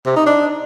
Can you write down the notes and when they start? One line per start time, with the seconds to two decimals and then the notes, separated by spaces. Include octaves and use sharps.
0.06 C3
0.16 D#4
0.26 D4